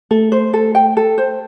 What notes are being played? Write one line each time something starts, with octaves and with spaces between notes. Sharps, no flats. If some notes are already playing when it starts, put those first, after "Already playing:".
A3 A4
C5
A4
G5
A4
C5